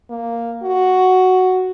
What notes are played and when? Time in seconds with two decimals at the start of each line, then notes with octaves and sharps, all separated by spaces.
0.10 A#3
0.63 F#4